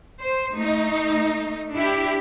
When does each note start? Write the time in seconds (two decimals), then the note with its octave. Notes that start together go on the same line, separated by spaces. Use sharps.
0.22 C5
0.55 A3 D#4
1.75 D4 E4 G4